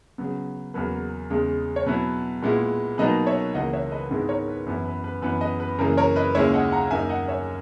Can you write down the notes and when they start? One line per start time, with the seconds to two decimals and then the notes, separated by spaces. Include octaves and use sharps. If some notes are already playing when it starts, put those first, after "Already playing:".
0.18 C#3 F#3 B3
0.74 E2 C#3 F#3 A#3 B4
1.30 E2 C#3 G#3
1.76 C#5
1.86 B2 F#3 B3 E4 B4
2.43 A#2 G#3 B3 E4
2.98 B2 F#3 A#3 D#4 B4 D#5
3.27 C#5 E5
3.54 C#2 C#3 E3 A#3 E4 D#5 F#5
3.73 C#5 E5
3.91 B4 D#5
4.11 G#2 D#3 G#3 B3 E4
4.29 A#4 C#5
4.48 B4
4.66 F#2 E3 B3 E4 B4
4.86 B4
5.04 B4
5.22 F#2 E3 B3 B4
5.41 B4 D#5
5.60 B4
5.78 F#2 C#3 E3 A#3 A#4
5.97 A#4 C#5
6.16 B4 D#5
6.35 D#2 C#3 G#3 C#4 E4 C#5 E5
6.53 D#5 F#5
6.72 F#5 A#5
6.91 F#2 D#3 A#3 D#4 E5 G#5
7.09 D#5 F#5
7.28 C#5 E5